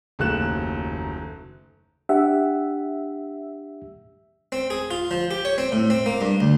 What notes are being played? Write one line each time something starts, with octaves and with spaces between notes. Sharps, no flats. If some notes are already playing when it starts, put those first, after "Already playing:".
F#1 D#2 A3 F#6 E7
D4 G4 E5 F#5
C4
G#4
F4
F3
G4
C#5
C4
A2
C4
A#3
G2
D2